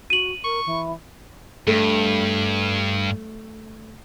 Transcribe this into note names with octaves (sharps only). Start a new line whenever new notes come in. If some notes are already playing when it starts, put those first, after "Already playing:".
F#4 D#7 F#7
A#4 C#6
E3
G2 A3